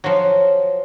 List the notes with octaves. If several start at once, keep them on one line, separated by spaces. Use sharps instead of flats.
F3 F#3